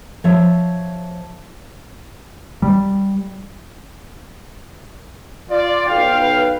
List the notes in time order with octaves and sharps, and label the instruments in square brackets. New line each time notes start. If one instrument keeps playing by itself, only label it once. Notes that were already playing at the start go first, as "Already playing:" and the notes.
[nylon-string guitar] F3 C#5 E5
[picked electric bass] G3
[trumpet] F4 [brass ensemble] D5
[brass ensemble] B1 F5 G5
[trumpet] B4